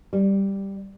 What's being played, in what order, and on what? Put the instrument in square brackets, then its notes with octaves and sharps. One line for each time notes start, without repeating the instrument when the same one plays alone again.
[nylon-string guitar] G3